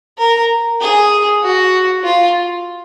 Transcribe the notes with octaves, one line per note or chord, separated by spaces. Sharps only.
A#4
G#4
F#4
F4